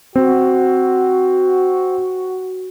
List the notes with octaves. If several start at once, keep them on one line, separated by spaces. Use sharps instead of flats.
C4 F#4